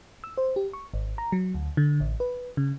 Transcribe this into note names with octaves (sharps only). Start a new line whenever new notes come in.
E6
C5
G4
C#6
G#1
A#5
F#3
D2
D3
A1
B4
C#3